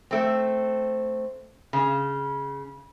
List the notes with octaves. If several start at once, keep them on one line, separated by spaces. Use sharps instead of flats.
A3 C4
C#3